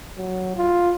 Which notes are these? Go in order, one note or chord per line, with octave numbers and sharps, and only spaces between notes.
F#3
F4